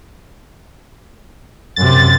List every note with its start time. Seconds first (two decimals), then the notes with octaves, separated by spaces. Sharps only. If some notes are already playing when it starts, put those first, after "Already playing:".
1.76 F#2 C3 A6